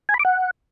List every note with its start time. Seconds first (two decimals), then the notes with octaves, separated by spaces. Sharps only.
0.09 G#5
0.14 B5
0.19 D6
0.25 F#5